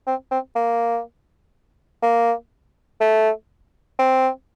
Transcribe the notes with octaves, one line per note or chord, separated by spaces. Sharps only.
C4
C4
A#3
A#3
A3
C4